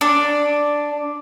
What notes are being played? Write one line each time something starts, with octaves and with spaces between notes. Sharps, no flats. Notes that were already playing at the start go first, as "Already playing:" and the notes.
D4